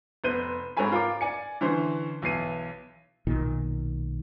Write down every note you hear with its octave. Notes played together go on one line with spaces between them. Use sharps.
F1 B3 C5 F#6 G6 D#7
G#2 C4 A4 C#5 G#5 B5
F4 A#4 D6
D5 G#5 C#7
D3 E3 C#4 C5
B1 E3 E4 C7 D#7
B1 A#2 D#3